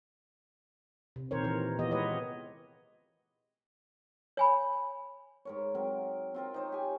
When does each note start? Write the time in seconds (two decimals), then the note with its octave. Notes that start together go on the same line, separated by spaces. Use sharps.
1.16 C3
1.31 A#2 D#3 C4 A#4 C5 C#5
1.44 E3 A#4
1.79 E3 B3 F4 G4 D#5
1.91 G#3 B4 C#5 D#5
4.37 C#5 G#5 B5
5.45 G#2 A#4 C#5
5.75 F#3 C4 A#4
6.34 C4 F4 A#4
6.54 D#4 C5 C#5
6.72 G4 G#5